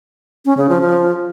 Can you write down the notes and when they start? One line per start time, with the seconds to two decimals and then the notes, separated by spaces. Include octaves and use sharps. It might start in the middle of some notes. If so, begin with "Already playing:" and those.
0.45 C#4
0.57 C#3
0.69 F3
0.81 F3